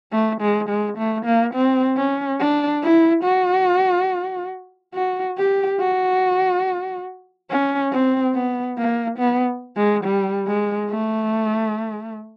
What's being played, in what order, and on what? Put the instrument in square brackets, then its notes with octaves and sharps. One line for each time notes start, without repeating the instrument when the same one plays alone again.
[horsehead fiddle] A3
G#3
G#3
A3
A#3
C4
C#4
D4
E4
F#4
F#4
G4
F#4
C#4
C4
B3
A#3
B3
G#3
G3
G#3
A3